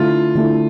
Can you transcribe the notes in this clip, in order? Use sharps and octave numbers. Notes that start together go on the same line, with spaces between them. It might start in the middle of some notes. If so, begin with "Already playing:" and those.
Already playing: D3 A3 E4 F4
D3 A3 E4